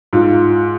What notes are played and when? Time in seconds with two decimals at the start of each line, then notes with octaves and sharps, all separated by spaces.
0.13 G#2 F4